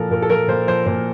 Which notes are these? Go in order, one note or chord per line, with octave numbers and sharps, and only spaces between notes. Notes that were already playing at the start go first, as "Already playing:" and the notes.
Already playing: A#2 F3 A4 A#4
A#2 A#4
A4
F3 A#4
A#2 C5
F3 C5
A#2 C5